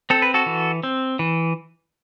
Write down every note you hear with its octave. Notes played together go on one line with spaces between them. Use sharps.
C4 A4
B4
F#4 A4
E3
C4
E3